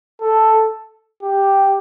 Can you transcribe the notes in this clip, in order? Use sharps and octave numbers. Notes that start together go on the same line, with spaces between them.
A4
G4